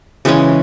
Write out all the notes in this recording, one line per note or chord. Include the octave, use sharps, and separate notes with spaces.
C#3 E3 G#3 C#4